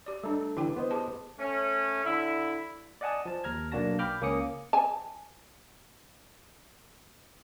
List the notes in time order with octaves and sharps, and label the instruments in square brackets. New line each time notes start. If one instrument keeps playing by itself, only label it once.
[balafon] G4 D5
[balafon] G3 D4 [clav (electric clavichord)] A3 A4
[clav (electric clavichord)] D3 E3 [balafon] E4 G4 G5
[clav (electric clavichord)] B3 C5 D#5
[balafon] G4 G#4 A5
[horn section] A3 C#4
D3 E4
[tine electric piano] D5 D#5 F#5 G#5 A5 D#6
F3 A5
D#2 A#5 F6 G#6
B1 A#3 D4 F#4 A5 A#6
G5 B5 D6 F6 G6
C#2 A#3 C#4 D6 D#6 C#7
[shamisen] G#5 A5